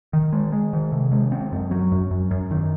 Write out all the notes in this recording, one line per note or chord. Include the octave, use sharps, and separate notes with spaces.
D#3
G#3
G#3
D#3
C3
G#3
C4
F#2
F#3
F#2
F#2
F#2
D#3